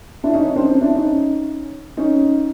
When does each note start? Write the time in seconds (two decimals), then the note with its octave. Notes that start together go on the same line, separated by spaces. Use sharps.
0.24 D4 E4
0.33 C#4 D#4
0.44 C#4 D#4
0.56 C4 D4
0.66 C#4 D#4
0.81 D4 E4
0.95 C#4 D#4
1.97 C#4 D#4